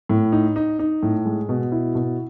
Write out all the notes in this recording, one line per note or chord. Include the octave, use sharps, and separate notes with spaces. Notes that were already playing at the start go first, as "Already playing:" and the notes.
A2
D#4
D#4
D#4
A2
G#3
B2
E4
B2